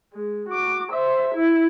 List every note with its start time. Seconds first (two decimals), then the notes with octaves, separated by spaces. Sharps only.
0.13 G#3
0.49 F#4 D6
0.92 C5 E5
1.35 E4